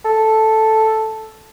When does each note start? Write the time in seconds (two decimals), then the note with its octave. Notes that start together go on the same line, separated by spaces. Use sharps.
0.05 A4